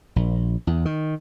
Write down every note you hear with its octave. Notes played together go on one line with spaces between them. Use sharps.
A#1
E2
D#3